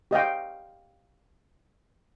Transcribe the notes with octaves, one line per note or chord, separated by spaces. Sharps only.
G4 D#5 F5 G5